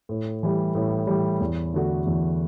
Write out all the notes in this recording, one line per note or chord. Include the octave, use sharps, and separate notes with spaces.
A2
E3 G3
A2
E3 G3
E2
D3 A3 D4 F#4
E2